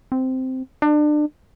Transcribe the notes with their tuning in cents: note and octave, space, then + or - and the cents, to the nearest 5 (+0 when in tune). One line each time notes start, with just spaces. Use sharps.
C4 -10
D4 +30